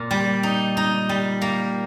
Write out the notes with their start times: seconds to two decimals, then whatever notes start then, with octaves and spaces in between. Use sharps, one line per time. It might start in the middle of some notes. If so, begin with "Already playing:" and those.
Already playing: A#2
0.11 G3
0.43 D#4
0.77 D#4
1.09 G3
1.42 A#3